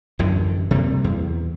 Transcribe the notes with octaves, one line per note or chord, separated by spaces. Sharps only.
A1 F#2 A2 D3
C3 G3 A3 A#3
E2